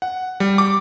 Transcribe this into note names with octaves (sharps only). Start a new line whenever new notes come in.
F#5
G3
D6